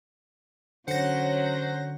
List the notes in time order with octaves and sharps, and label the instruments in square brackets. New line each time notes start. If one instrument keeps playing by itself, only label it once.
[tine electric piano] D3 [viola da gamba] F#3 C#4 [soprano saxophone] C5 [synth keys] F#5 A#6